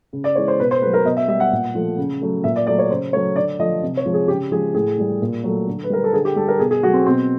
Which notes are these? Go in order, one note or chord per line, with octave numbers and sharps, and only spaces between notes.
C#3
D5
E3 G#3 C#5
C5
B2 B4
C5
F#3 A3 B4
A#4
B2 D#5
E5
G3 E5
F#5
A#2
F3 A3
C#3
F#3 A3
A#2 E5
D5
F#3 A3 D5
C#5
C#3 C5
F#3 A3 C#5
D3 D5
F3 A3 D#5
C3
C#5
F3 G#3
G#4
C#3 G4
F3 G#3 G#4
A2 G#4
E3 G3
A#2
F#3 A3
D3
B4
G3 A#4
A4
D3 G#4
G4
G3 A4
A#4
B2 G#4
G#4
F#3 A3 F#4
C4
B2 C4